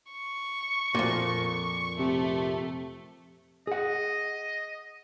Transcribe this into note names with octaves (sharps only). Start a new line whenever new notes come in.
C#6
F2 A#2
C3 A3
G#4 D#5 F#5